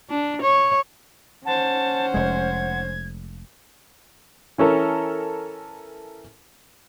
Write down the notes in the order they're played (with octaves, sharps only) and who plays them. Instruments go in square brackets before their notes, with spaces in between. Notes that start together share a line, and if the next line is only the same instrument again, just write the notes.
[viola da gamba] D4
C#5
[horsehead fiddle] C#4 C5 [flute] F#5 [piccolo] A5
[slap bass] F1 G#3 [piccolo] G#6
[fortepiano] E3 C#4 A4 A#4